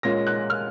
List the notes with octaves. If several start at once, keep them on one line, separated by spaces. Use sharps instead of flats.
A#2 G#3 C#4 A#6
F#6
F6